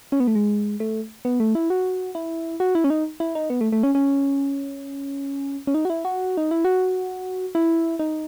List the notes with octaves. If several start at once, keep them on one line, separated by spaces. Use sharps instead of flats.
C#4
B3
A3
G#3
A3
B3
A3
E4
F#4
E4
F#4
E4
C#4
D#4
E4
D#4
B3
A3
A3
C#4
C#4
C#4
D#4
F#4
E4
F#4
D#4
E4
F#4
E4
D#4